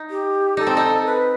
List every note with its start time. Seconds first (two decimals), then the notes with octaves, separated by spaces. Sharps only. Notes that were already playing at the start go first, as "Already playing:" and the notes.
Already playing: D#4
0.10 G4
0.57 D#4 A4
0.67 C4
0.77 D#4
1.06 B4